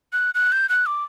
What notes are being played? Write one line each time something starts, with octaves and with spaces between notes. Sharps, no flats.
F#6
F#6
G6
F#6
D6